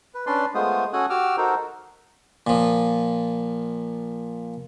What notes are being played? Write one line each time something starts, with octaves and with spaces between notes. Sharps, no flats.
B4
C#4 D4 B4 D5 C6
G#3 A3 B3 F4 C5 D#6
C#4 F#4 A4 G#5 D#6 F#6
F#4 G4 D6 E6 F6
D#4 F#4 A4 A#4 C5
A#2 F3